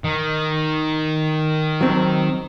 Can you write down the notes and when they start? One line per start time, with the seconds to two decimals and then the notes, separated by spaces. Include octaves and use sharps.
0.04 D#3
1.81 F#3 C4